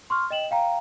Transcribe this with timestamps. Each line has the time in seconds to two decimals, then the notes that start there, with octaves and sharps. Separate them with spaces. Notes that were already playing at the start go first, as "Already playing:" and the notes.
0.10 C6 C#6 F6
0.31 D#5 G5 E7 F#7
0.51 F5 G5 A#5